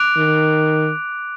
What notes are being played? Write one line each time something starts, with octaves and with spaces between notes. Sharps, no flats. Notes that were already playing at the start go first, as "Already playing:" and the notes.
Already playing: D6 F#6 D7 F7
D#3